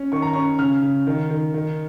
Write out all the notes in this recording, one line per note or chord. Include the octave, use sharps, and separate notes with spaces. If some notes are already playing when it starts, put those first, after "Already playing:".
Already playing: C#4
D#3 C#6
A#5
C#4 C#6
C#3 F6
C#3
D#3
D#3
D#3